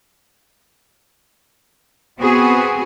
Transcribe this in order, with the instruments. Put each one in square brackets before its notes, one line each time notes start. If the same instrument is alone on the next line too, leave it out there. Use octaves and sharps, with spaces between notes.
[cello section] B3 C4 F#4 G#4